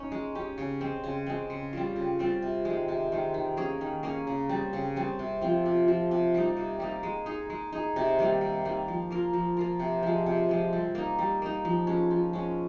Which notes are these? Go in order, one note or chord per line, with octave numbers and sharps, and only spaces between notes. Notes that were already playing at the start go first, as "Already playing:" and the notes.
Already playing: A#3 C#4 D#4
G#3
C#4 G4
C#3
G#3 C4
C#3
G#3 C4
C#3
G3 C4 F4
C#3
G3 C4 F4
C3
D#3 G#3
C3
D#3 G#3
D#3
A#3 C#4 G#4
D#3
A#3 C#4 G#4
C#3
G3 C4
C#3
G3 C4
C3
F3 C4 F4
C3
F3 C4 F4
C3
G3 A#3 D#4
C3
G3 A#3 D#4
G#3
D#4 G#4
G#3
D#4 G#4
C3
D#3 G3 A#3
C3
D#3 G3 A#3
F3
A#3 F4 A#4
F3
A#3 F4 A#4
C3
F3 G#3
C3
F3 G#3
G3
A#3 D#4
G3
A#3 D#4
F3
G#3 C#4
F3
G#3 C#4